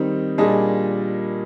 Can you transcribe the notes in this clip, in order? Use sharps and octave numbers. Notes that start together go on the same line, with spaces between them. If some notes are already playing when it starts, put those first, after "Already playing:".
Already playing: D#3 G3 C4 D#4
A#2 G3 D4 G#4 D#5